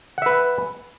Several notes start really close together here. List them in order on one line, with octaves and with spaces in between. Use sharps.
F#5 E5 B4